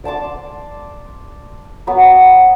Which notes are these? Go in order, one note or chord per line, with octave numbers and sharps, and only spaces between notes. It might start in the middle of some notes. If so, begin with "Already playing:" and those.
D5 A5 C6 D6
F#3 B3